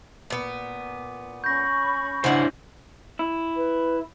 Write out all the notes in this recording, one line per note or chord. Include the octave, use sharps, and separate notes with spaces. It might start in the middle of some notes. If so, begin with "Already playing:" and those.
A#2 B3
C#4 B5 C#6 G6 A#6
C#3 D4 E4 C5 F#5
E4
B4